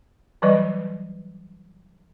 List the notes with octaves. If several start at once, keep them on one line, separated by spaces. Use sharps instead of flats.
E3 F#3 G3 B4 D5 D#5